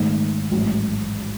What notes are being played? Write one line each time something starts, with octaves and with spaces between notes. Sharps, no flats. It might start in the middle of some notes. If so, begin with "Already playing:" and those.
Already playing: G#2 D#3 A3 D#4
A1 G#2 F#3